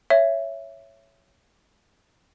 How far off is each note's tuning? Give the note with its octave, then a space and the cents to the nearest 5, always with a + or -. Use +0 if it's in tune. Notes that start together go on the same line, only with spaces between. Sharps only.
C#5 +0 E5 +15